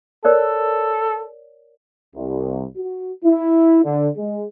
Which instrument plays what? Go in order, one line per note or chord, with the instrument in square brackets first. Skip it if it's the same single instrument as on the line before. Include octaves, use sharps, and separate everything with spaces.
[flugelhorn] A4 [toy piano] A#4 C#5 D5
[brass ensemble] C2
F#4
E4
D3
G#3